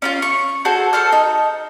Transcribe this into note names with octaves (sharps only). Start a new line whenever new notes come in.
C#4 E4 F4
C#6
F#4 G#4 A4 C5
A4 C5 A5 F6
D#4